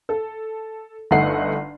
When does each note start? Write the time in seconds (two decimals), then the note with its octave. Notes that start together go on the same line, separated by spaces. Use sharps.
0.09 A4
1.11 G1 A3 D#4 F#5 C7